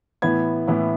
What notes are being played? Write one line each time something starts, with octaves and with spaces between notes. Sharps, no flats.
A2 E3 B3 E4 G#6
A2 E3 B3 E4